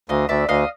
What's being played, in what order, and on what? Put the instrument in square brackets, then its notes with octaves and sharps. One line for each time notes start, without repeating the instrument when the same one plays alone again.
[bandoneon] D2 [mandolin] D#5 F5
[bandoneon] D2 [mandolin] D5 E5
[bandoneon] D2 [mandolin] D#5 F5